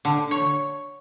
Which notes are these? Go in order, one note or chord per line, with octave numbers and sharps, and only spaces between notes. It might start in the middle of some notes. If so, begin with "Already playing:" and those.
D3
C#5